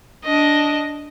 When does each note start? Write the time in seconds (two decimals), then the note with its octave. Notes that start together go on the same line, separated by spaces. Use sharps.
0.25 D4 D#5